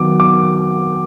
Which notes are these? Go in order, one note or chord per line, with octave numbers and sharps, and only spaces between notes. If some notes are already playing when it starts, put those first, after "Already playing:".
Already playing: D#3 F#3 B3 D6
D6